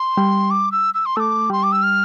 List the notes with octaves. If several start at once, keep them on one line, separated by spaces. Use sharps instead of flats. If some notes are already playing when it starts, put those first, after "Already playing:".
Already playing: C6
G3
D6
E6
E6
C6
A3 D6 E6
G3 C6
D6
E6
F6